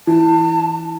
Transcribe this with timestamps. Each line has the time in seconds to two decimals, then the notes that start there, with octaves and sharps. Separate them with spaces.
0.07 E3 A5